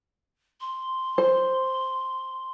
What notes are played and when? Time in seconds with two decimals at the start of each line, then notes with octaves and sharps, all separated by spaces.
0.61 C6
1.18 C5